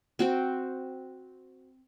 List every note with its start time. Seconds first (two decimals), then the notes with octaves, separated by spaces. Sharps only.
0.19 C4 F#4 C5 G5